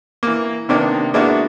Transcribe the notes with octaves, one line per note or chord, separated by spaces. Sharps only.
E3 A#3
C3 D#3 A#3 B3 D4
G#3 A#3 B3 D4 E4 F#4